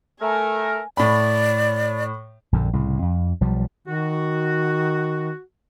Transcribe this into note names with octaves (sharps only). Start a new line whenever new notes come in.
A3 A#4 G#5
A2 D5 B5
A#1 F#2 D3
C2 A2 C#3
F2
B1 F3 G3
D#3 F#4